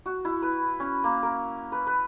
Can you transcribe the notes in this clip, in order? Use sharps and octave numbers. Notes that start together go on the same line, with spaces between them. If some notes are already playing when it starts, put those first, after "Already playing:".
F#4
E4
B4
C#4
A#3
A#4
B4
B4